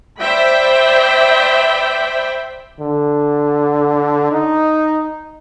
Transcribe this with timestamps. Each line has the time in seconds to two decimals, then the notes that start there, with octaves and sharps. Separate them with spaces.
0.20 C5 D5 E5 G5 B5
2.81 D3
4.32 D#4